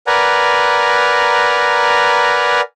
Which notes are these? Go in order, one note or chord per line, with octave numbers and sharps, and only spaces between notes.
A#4 B4 D5 F#5 G#5 A#5